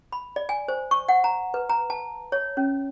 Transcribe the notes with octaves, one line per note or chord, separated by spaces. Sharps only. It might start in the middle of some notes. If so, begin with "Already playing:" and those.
B5
D5
G#5
C5
C#6
F#5
A#5
B4
A#5
A5
C#5
C#4